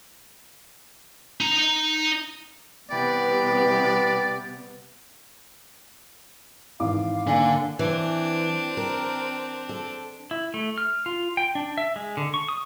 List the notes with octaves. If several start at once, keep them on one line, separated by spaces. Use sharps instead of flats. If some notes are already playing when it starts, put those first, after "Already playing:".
D#4 A#5
C3 E3 G3 B3 D5 G5 B5
G#1 E3 F5 D6
D3 A#3 D4 G#5
E3 C4 D4
A#4
A4
E4
A3
F6
F4
G5
D4
E5
G#3
D3
C#6
D#6